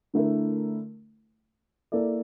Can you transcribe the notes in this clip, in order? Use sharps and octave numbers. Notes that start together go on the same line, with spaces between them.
D3 A3 E4 A#4
A#3 E4 A4 D5